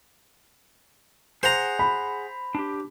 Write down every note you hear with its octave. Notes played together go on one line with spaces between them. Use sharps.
G#4 C5 F#5 A#5
B5
D4 G4